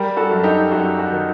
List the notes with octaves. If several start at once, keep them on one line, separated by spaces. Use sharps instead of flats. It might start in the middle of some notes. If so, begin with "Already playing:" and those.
Already playing: G3 G4 A#4
F#4 A4
F#2
D#4 G4
F#2 F#4
F#4
D#3